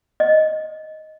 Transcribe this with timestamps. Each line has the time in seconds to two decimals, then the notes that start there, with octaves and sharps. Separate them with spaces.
0.20 D#5